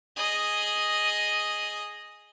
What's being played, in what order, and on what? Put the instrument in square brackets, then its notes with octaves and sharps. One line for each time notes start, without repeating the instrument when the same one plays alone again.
[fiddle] G#4 D#5